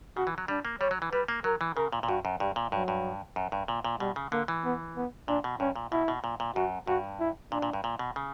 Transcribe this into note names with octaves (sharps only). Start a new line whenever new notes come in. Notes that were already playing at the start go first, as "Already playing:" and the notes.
C#3 F#4
E3
F#3
G3 D4
A#3
G3 C#5
F#3
E3
G3 B4
A#3
F#3 A#4
E3
C#3 A#4
A#2
A#2
G2 F#4
F#2
G2 G3
A#2
G2 F#3
G2
F#2
G2
A#2
A#2
B2 G3
C#3
D3 A#3
E3
B3
B3
A#2 D4
B2
G2 C#4
A#2
B2 E4
B2
A#2
A#2
F#2 F#4
G2 F#4
E4
A#2 D4
A#2
G2
A#2
B2
C#3